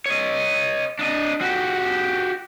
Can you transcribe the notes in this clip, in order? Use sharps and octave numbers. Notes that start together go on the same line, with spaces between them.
C#5 D#5
D4 D#5
F#4 G4